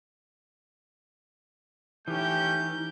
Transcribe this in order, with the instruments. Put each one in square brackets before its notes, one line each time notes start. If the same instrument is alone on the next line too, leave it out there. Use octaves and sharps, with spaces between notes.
[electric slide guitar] E3 [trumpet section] A3 C#4 G4 [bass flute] D#4 [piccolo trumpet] G6